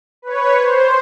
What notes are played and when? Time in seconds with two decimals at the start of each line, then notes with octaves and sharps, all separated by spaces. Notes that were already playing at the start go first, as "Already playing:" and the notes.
0.22 B4 C#5
0.58 C5